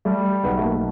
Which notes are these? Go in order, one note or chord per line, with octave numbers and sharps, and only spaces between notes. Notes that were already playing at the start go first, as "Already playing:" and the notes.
G3 A3
B1 B3
A3
A#3